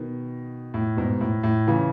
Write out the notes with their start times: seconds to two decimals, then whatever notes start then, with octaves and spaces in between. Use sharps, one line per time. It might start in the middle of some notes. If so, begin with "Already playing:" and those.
Already playing: B2 D#3
0.74 A2
0.97 G#2 B2
1.21 A2
1.43 A2
1.67 C#3 E3